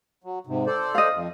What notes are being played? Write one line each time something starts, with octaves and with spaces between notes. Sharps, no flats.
F#3
G#2 C3
A4 C5 D5
D#5 F5
F2